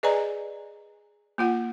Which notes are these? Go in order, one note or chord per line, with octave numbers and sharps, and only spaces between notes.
G#4 B4 D5 D#5 G#5 A#5
A#3 F4 F#5